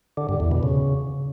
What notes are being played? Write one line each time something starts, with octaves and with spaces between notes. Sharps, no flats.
D3
G2
E2
B2
C#3